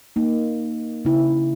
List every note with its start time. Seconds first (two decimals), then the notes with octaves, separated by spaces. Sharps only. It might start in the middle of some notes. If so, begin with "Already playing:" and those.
0.16 A#3 D#4
1.05 C#3 E4